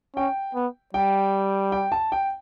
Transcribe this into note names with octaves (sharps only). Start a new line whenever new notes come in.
C#4 G5
B3
G3 G5
G5
A5
G5